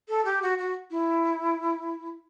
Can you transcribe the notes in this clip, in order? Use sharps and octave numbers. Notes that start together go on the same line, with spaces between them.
A4
G4
F#4
F#4
E4